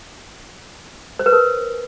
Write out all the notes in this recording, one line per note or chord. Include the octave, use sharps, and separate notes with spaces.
C5
B4
A#4